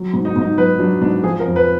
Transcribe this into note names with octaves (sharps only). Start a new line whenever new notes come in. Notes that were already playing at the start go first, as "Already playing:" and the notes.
Already playing: F#3
G#2
D#4
G#2
D#4
F#3 B4
F#3 D4
G#2 D4
F3 G#4
A#4
F2
B4